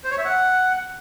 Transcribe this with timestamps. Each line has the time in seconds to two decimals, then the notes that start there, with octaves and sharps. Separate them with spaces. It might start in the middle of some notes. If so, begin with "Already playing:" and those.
0.04 C5
0.11 C#5
0.18 E5
0.25 F#5